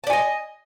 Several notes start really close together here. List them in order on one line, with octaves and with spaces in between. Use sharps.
A5 D5 G#5 D#5